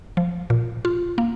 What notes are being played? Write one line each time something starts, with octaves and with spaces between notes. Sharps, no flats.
F3
A#2
F4
A#3